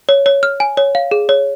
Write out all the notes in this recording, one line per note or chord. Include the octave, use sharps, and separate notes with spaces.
C#5
C#5
F6
G#5
C#5
F5
G#4
C#5